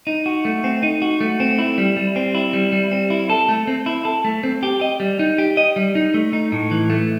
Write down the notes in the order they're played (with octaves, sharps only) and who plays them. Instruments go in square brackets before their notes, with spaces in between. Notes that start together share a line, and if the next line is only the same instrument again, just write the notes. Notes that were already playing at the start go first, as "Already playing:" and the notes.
[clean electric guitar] D#4
F#4
A3
C4
D#4
F#4
A3
C4
E4
G3
G3
C4
E4
G3
G3
C4
E4
A4
A3
C4
E4
A4
A3
C4
G4
D#5
G3
D#4
G4
D#5
G3
D#4
A3
D#4
A2
E3
A3